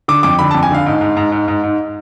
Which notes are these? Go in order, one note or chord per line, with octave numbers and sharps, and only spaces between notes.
D3 D6
F2 D6
D3 B5
A5
F2
G#5
D3 F5
G#2
G#2
G#2
G#2
G#2
G#2